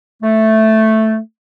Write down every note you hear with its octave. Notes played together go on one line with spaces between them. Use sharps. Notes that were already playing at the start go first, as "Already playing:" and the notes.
A3